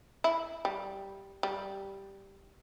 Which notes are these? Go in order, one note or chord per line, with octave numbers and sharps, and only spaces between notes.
E4
G3
G3